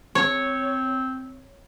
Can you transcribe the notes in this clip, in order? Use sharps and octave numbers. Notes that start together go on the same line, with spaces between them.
C4 C#5